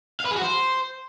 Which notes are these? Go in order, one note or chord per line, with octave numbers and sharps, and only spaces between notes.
F5
B4
G#4
F#4
C5